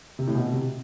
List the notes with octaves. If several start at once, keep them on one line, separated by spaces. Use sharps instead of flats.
C3
A2
B2
C3